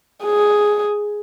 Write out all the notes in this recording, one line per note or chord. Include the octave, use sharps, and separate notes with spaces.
G#4